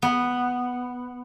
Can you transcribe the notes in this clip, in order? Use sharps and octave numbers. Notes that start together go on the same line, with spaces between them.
B3